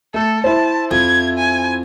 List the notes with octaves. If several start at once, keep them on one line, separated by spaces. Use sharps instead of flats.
A3 A4
E4 C5 A5
F2 G#6
G#5